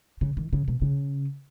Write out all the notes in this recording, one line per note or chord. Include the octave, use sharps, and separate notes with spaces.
C#3
D#3
C#3
B2
C#3